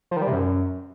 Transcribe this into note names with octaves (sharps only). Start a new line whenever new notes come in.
F3
D#3
G3
C3
F#2